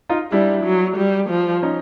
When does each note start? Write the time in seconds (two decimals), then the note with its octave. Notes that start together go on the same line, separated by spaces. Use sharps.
0.09 D#4 F4
0.32 G3 D4 E4
0.64 F#3
0.97 G3
1.30 F3
1.62 C#4 D#4